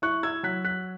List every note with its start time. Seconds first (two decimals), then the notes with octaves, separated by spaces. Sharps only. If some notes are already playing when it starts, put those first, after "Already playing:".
0.02 E4 C#6 F#6
0.23 E6 G#6
0.43 F#3 F#6 B6
0.65 F#6 B6